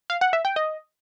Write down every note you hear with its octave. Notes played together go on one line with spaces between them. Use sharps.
F5
F#5
E5
G5
D#5